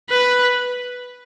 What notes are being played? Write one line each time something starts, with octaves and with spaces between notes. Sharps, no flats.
B4